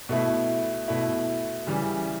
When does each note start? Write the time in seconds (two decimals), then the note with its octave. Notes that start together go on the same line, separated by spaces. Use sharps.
0.09 B2 A3 E4
0.88 B2 A3 E4
1.67 C#3 E3 G3